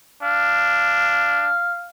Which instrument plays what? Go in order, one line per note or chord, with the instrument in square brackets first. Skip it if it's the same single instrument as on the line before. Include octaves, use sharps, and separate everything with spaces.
[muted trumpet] D4 [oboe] F5